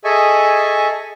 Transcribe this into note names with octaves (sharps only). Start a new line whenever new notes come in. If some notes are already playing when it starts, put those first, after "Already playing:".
G#4 A4 D#5 E5 G#5 C#6